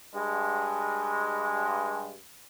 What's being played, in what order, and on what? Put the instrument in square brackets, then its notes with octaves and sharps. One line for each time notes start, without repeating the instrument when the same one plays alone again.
[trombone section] G2 G#3